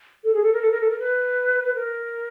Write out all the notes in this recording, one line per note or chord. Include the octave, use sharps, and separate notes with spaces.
A4
G#4
A4
A#4
A4
A#4
A4
A#4
B4
A#4